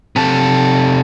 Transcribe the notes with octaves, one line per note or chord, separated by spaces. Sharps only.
C3 A4